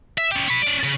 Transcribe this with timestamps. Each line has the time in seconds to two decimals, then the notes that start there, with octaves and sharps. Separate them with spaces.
0.18 E5
0.31 C#4 G4
0.49 C#5 B5
0.62 C#4 D5
0.84 C#3